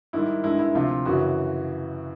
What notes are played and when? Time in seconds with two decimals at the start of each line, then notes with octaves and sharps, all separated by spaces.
0.13 G#2 D#3 G3 E4
0.44 G2 D#3 G#3 E4
0.59 E4
0.75 D2 C3 F3 F4
1.05 F#2 C#3 E3 F#4